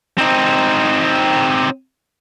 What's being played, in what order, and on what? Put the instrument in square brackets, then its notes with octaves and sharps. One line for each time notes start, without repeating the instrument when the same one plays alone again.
[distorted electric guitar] C4 D#4